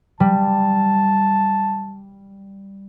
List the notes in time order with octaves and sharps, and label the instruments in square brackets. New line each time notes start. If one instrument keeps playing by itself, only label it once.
[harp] G3 [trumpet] A5